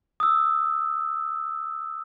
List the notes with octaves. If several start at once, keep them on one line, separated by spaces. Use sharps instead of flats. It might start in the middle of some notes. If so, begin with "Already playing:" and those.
D#6 E6